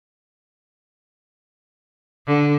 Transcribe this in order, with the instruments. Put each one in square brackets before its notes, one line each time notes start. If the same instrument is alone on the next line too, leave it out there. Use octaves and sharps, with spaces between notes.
[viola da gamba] D3